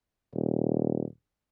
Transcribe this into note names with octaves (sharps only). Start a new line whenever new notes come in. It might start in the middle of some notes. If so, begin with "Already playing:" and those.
D#1